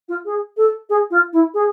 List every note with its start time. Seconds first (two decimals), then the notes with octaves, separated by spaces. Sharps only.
0.09 F4
0.25 G#4
0.57 A4
0.90 G#4
1.11 F4
1.33 E4
1.54 G#4